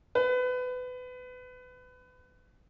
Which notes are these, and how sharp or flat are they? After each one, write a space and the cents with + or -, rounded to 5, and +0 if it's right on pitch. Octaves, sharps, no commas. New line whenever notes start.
B4 +25